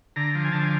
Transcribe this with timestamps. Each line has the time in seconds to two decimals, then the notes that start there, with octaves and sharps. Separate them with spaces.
0.16 D3 A#5
0.35 F3
0.45 G#5
0.52 D3 A5
0.60 G#5